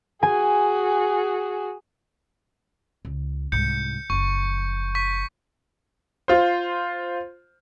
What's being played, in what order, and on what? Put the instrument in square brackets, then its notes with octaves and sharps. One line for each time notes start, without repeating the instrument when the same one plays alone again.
[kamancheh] F#4 G#4 [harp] G#5
[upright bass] C#2
[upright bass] C2 G#2 [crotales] G6 C#7
[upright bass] F#1 F3 [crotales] C#6
[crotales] C#6 B6
[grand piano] F4 C5